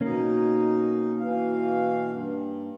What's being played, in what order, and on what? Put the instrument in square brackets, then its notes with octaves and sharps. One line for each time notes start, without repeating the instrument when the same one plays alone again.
[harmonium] B2 D#4 [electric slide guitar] A#3 C#4
[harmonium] B2 E3 F5
G2